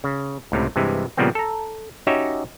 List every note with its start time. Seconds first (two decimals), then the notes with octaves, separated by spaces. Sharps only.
0.04 C#3
0.52 C#2 A2 C3
0.76 G2 C3 E3 G#3
1.17 A#2 C#3 F3 G3 B3 C4
1.35 A4 A#5
2.07 C#4 D#4 F#4 G4 C#5 E5